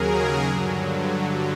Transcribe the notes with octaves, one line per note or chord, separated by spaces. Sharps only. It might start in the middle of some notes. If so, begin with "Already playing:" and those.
Already playing: D#2 C#3 F#3 G#4 A#4
G2 D3 F#3